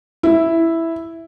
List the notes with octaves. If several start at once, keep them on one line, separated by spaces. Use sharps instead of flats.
E4